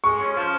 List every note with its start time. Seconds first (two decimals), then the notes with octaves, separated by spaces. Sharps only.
0.04 G#3 C#6
0.20 C#4
0.36 F3